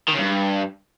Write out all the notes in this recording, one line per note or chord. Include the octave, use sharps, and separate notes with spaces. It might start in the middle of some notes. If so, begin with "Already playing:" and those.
D#3
C#3
G2